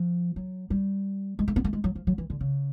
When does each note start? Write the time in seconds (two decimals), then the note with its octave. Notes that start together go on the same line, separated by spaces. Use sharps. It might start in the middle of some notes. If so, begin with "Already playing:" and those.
Already playing: F3
0.36 F#3
0.70 G3
1.39 G#3
1.48 A3
1.56 B3
1.64 A3
1.73 G#3
1.84 F#3
1.95 F3
2.07 F#3
2.18 E3
2.30 D3
2.41 C#3